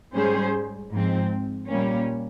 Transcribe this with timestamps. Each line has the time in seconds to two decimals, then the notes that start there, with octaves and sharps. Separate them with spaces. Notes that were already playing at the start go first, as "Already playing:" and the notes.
0.12 G#2 G3 C#4 G#4 C5
0.90 G#2 F3 G#3 C4
1.68 A#2 G3 A#3 C#4